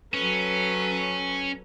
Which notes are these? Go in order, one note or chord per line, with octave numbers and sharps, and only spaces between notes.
F#3 C#4 A4 B4